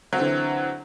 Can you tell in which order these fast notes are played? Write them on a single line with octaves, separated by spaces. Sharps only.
F#3 C4 D3 E3